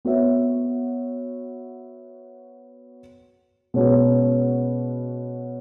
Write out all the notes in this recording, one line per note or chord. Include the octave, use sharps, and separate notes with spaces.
B3 F#4 C#5 E5
B2 G#3 C#4 F#4 B4